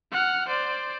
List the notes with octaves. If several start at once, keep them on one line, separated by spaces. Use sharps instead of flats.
F#5 F6
C5 D5